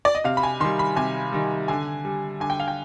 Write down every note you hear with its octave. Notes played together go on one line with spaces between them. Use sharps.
D5
D#5
C3 F5
B5
G#5
D#3 G3 C6
B5
C3 G#5
D#3 G3
D3 G#5
G3
D3 G#5
G5
F5
G5